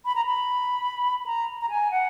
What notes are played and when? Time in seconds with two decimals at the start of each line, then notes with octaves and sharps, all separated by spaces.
0.05 B5
0.16 A#5
0.25 B5
1.26 A#5
1.61 A#5
1.69 G#5
1.91 F#5